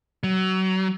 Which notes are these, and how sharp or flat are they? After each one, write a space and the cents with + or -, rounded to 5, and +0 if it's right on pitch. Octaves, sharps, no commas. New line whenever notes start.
F#3 +25